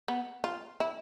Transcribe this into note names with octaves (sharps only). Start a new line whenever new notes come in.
B3
F4
E4